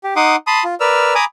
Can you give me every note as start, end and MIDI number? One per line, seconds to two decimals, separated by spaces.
0.04 0.14 67
0.16 0.36 63
0.16 0.36 78
0.16 0.36 84
0.16 0.36 86
0.16 0.36 87
0.47 0.64 81
0.47 0.64 83
0.47 0.64 84
0.47 0.64 87
0.64 0.75 65
0.80 1.14 70
0.80 1.14 71
0.80 1.14 74
0.80 1.14 88
0.80 1.14 89
1.15 1.25 80
1.15 1.25 82
1.15 1.25 83
1.15 1.25 86
1.15 1.25 87